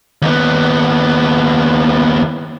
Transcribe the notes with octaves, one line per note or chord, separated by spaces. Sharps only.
D#2 B3